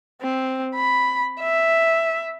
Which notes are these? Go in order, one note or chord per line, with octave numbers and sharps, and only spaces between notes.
C4
B5
E5